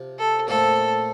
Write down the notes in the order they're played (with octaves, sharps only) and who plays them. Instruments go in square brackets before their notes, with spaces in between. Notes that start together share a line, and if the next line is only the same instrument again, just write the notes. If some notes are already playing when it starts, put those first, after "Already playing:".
Already playing: [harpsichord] C3 F3
[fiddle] A4
[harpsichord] A#2 F3 A3 C4 [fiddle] A4